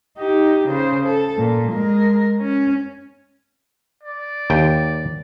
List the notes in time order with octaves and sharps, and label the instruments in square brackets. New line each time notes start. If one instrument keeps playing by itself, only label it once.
[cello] D#4 G4
C#3 C5
A4
A#2
G#3 A#4
C#4
[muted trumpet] D5
[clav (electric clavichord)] D#2 G5